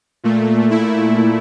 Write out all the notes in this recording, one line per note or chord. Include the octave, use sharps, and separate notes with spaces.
A#2 A3
E4